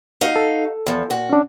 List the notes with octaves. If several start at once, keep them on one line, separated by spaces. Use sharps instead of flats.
D#4 F#4 F5
A4
E2 F3
A#2 F#4
C#4 D4